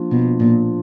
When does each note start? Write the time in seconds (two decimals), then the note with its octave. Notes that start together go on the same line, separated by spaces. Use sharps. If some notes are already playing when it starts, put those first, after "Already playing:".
Already playing: F3 A#3 D4 F4
0.12 B2
0.40 A#2